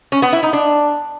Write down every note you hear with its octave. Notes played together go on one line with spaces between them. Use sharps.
C#4
B3
E4
D#4
D4